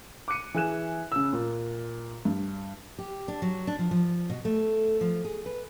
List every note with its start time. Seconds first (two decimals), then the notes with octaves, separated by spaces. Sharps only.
0.28 D6 F#6 C#7 D#7
0.54 E3 G#4 G#5 F#6 E7
1.12 C#3 E6
1.33 A#2
2.25 G2
2.98 G4
3.28 D4
3.42 F#3
3.67 D4
3.79 F3
3.91 F3
4.30 B2
4.45 A3
5.01 F3
5.25 G#4
5.46 B4